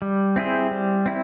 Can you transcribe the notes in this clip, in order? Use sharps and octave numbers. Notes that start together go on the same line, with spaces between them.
G3
C4 E4 G#4 C5
G3
C4 E4